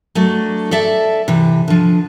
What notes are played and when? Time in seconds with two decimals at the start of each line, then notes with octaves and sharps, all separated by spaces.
0.15 F#3 A3 D4 D#5
0.71 A4 D5 E5 A5
1.28 C3 E3
1.68 D3 F3